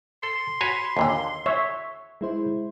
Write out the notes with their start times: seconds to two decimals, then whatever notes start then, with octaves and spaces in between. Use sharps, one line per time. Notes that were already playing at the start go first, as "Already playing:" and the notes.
0.23 A4 C6
0.61 F#4 C#5 G#5 B5
0.97 D#2 A#2 D3
1.46 C#5 E5
2.21 G#3 E4 C5